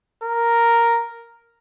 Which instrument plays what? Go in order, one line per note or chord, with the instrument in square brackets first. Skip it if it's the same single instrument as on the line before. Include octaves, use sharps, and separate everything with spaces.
[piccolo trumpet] A#4